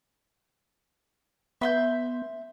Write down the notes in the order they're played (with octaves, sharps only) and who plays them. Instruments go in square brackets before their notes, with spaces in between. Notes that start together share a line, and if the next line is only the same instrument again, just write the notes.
[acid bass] B3 [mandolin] E5 C6 G6